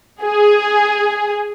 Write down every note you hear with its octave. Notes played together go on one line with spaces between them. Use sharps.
G#4